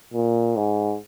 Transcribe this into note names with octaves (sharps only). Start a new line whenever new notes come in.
A#2
G#2